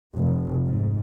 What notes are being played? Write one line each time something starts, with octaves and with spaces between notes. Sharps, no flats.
F1
G#2